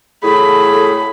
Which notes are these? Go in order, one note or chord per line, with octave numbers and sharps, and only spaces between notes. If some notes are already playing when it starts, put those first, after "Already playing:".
A2 G#4 A4 B5